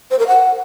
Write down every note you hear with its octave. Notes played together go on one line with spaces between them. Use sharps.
C5
A#4
F#5